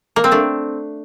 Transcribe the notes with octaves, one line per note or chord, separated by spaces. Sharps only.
A#3
C4
A3 D4